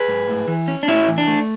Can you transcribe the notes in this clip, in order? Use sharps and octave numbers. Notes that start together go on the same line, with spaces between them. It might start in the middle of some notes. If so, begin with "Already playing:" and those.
Already playing: G#4 B4
G#2
A2
E3
C#4
D4
A2 C#4 E4
E3
D4
A3